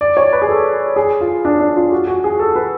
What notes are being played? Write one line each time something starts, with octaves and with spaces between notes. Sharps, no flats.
D5
C#5
B4
G#4
A4
G#4
F4
D4
D4
F4
F#4
F#4
G#4
A4
B4